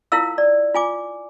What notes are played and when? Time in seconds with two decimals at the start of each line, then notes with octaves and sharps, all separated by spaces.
0.12 E4 F4 A#4 F5 E6
0.38 D5
0.74 F4 G#5 D6